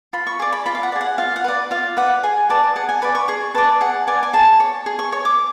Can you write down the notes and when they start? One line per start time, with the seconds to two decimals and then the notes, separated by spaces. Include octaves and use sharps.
0.13 F4 B5
0.27 C#6
0.39 G#4 D5 C#6
0.52 B5
0.66 F4 B5
0.75 F5
0.83 F#5
0.92 D5
0.96 G#4
1.01 F#5
1.18 F4 F5
1.36 F#5
1.44 B4 D5
1.71 F4 F5
1.97 B4 D5 F#5
2.23 G#4 G#5
2.50 B4 D5 A5
2.76 G#4 F#5
2.89 G#5
3.02 B4 D5 B5
3.15 C#6
3.28 G#4 C#6
3.55 B4 D5 A5
3.81 G#4 F#5
4.07 B4 D5 G#5
4.23 G#5
4.33 G#4 A5
4.60 C#5
4.86 G#4
4.99 C#6
5.12 C#5 C#6
5.25 D6